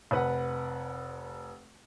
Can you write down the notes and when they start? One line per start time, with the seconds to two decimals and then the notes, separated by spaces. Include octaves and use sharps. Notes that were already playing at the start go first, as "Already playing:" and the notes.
0.11 F1 B4 F#5